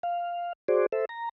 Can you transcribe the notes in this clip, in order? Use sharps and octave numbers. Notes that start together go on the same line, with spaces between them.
F5
F#4 G#4 C5 D5
A4 C5 E5
A#5